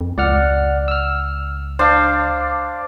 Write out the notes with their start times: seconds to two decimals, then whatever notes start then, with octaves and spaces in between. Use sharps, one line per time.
0.01 F2
0.18 C#2 D5 F#5 F6
0.88 E6 F6
1.79 D4 C5 F5